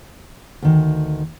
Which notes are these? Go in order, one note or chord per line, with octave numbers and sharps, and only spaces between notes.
D2 D#3